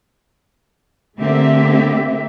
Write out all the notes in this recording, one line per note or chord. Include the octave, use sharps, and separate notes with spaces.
D3 A3 A#3 C4 G4 E5